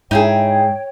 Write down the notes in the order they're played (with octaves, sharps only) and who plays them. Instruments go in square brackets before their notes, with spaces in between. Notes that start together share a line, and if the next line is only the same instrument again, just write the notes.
[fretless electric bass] G#2 [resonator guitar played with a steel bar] D#4 E4 G#4 [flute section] C#5 G5